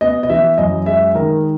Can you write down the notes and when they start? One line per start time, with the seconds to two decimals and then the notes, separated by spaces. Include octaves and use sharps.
0.01 B3 D#5
0.23 D#5
0.29 E3 E5
0.58 F#2 D#5
0.86 G#3 E5
1.15 D#3 A#4